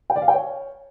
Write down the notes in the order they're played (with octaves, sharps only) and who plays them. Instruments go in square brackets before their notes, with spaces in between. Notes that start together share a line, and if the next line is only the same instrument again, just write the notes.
[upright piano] G5
D5
F5
G5
C#5